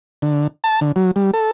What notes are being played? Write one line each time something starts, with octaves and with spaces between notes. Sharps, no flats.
D3
A5
D3
F#3
G3
A4